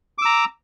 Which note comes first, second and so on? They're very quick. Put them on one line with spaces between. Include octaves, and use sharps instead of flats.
D6 E6 A#5